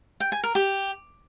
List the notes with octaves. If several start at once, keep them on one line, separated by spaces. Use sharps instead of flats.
G5
G#5
A#4
G4